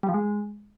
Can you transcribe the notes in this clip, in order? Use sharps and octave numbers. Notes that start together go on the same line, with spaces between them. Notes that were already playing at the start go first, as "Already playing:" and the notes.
G3
F3
G#3